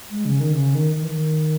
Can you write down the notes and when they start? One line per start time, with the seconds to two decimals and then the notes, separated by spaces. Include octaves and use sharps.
0.11 G#3
0.25 C#3
0.40 D#3
0.53 C#3
0.75 D#3
0.95 D#3
1.03 E3
1.10 D#3